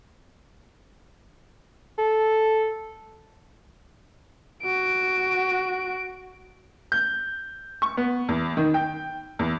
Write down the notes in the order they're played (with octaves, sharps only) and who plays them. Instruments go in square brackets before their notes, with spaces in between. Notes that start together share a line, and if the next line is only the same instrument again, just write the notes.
[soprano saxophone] A4
[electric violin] F#4 D7
[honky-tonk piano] G6
C#6
B3
E2
D#3
G5
E2